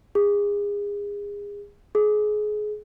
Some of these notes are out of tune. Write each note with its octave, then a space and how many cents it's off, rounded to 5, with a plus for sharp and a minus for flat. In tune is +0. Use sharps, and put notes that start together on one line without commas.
G#4 -30
G#4 +25